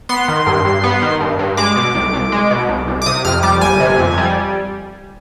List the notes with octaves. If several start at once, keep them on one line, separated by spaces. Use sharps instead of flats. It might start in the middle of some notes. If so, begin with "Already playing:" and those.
B3 C6
D#3
G2
G2
B3
D#3
G2
G2
G#3 D6
B2
C2
C2
G#3
B2
C2
C2
D6
C3 D#6
F2 F6
G3 D6
G1 G#5
C3
F2
G3